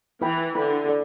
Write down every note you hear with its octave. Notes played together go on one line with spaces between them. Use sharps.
E3 E4 B4 G5 B5
D3 E4 B4 G5 B5
A4 D5